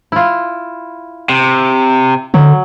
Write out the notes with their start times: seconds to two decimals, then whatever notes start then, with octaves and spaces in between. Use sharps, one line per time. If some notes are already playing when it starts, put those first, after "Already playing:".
0.12 E4 F4
1.30 C3
2.34 D3 F#3